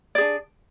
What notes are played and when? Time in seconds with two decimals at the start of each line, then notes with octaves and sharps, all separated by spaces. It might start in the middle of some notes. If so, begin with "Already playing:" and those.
0.15 D5
0.18 G#4
0.21 D4